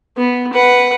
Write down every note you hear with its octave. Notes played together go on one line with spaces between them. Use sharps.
B3
B4 F#5